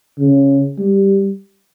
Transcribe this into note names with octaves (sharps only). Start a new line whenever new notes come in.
C#3
G3